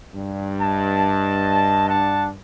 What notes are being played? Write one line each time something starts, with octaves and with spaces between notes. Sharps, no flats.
G2
D#5 A5
D4 F#5 A5